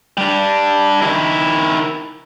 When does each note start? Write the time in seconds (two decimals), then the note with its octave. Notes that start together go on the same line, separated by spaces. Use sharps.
0.17 G3 D4
1.01 D#3 E4